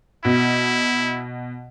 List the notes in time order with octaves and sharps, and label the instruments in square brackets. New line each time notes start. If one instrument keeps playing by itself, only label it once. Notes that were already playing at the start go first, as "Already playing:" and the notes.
[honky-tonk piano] B2 [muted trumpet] E4